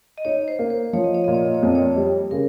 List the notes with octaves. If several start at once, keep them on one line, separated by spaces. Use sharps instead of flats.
D#5
D#4 C#5
C5
A#3
C5
F3 C#5
D#5
C#5
A#2 D#5
C#5
D#5
C#5
F2 D#5
C#5
G3
C#3 A#4